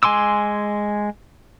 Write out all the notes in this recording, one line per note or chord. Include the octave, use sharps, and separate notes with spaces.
G#3 G#5 C6 D6 E6